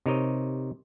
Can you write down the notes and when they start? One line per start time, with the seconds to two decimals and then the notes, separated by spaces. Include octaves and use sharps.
0.06 C3 D#4 A#4 C#5 D#5